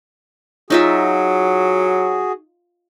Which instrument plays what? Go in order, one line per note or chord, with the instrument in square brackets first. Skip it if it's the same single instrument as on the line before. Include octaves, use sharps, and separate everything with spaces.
[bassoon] F#3 [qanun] D#4 F4 E5 [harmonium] F#4 G#4